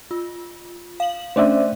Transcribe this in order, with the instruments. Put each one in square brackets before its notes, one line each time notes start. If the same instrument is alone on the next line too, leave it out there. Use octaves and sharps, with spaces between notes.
[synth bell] F4
F5 F#7
[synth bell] A3 C#4 D4 [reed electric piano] C5 D5 E5